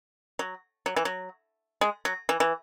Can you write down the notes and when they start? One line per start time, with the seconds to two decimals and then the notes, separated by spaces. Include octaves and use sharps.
0.39 F#3
0.86 F#3
0.96 E3
1.05 F#3
1.81 G#3
2.05 F#3
2.29 E3
2.40 E3